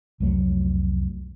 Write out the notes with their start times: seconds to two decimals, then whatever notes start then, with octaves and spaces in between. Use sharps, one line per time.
0.20 C2 F2 F#3 A3